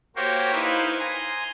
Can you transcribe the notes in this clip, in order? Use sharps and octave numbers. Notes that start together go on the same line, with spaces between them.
A#3 F#4 G4 A#4 C5 C#5
D#4 E4 B4 C5 E5 F5
G#5 A#5 C6 G#6